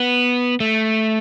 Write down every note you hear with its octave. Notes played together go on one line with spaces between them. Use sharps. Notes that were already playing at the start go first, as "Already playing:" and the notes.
Already playing: B3
A3